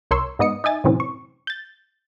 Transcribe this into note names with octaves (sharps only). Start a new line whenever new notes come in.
C2 A#4 C#5 C6 C#6 E6
G#2 B3 D#5 D#6 C#7
D#4 E5 G#5 A6
F#2 A2 C3 E3 C4 C#4
C#6
G6 A6